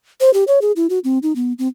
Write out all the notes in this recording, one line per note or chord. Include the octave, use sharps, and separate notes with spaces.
C5
G4
C#5
G#4
E4
F#4
C4
D#4
B3
C4